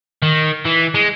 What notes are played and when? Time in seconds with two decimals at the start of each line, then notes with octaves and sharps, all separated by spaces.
0.22 D#3
0.65 E3
0.94 G#3